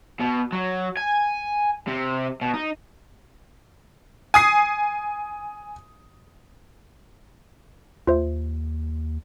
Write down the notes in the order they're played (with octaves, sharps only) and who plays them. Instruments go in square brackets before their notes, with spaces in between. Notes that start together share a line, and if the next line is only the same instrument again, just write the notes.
[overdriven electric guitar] B2
F#3
G#5
C3
B2
D#4
[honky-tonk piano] G#5 D#6 C7
[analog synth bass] D#2 [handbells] F4 C5 E5